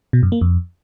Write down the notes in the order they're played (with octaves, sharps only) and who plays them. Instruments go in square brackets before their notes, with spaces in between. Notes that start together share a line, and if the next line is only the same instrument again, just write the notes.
[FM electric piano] B2
F#2
A#3
F2